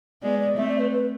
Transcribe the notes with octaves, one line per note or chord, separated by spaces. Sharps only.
G#3 B3 D5
D5
A3 C4 E5
D5
B4
B4